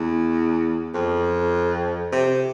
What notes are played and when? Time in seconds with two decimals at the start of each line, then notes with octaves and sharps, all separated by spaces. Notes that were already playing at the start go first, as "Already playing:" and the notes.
Already playing: E2
0.94 F2
2.12 C3